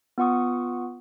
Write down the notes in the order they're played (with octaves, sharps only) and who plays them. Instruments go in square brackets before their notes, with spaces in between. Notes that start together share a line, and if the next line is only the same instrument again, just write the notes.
[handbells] B3 F4 F#5 C#6 D#6